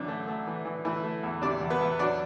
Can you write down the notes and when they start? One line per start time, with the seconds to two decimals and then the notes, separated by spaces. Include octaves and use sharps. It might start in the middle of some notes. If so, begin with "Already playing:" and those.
Already playing: F#2 D3 E3 D4
0.08 A3
0.28 A3
0.47 E3
0.65 E3
0.85 E3 A3 E4
1.04 A3
1.23 E2
1.42 C3 D4 D5
1.61 E2
1.70 B3 B4
1.80 E2
1.99 F#3 D4 D5